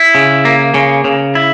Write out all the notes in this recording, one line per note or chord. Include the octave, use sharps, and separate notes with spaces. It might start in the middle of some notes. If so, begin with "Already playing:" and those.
Already playing: E4
C#3
A#3
C#3
C#3
E4